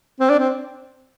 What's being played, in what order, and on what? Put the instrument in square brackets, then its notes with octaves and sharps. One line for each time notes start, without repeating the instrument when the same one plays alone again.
[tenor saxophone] C4
D4
C4